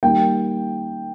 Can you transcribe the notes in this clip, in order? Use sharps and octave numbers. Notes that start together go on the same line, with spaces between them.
D#3 G3 A#3 G5